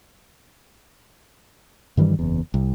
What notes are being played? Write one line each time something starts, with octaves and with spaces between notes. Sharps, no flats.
G2 D#3 E3 G3
F#1 E2
C2